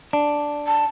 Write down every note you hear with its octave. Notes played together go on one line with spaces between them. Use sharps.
D4
A5